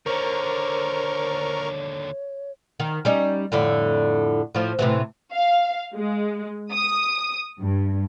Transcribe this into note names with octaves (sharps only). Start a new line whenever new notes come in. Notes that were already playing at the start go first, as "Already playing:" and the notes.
D#2 D3 A#4 C5 C#5 A#5 C#6
D#3
G3 C#4 D#4
F2 A2 D3
A2 F3
A2 C3 E3
F5
G#3
D#6
G2